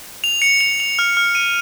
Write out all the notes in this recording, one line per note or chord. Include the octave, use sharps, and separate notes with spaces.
F7
C#7
F7
F7
F6
F6
D#7